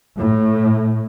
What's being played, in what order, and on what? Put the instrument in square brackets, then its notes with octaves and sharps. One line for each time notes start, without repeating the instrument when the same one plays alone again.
[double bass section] A2